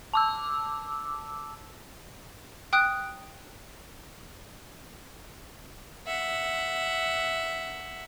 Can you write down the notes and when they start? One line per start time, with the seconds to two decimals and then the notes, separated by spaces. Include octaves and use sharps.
0.13 A5 D6 E6
2.73 G5 D#6 F#6 D7
6.07 E5 F#5